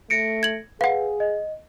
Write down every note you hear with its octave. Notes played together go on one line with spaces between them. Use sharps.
A3 A#6 C#7 D7
G#6 F#7
G#4 B4 F5 F#5
D#5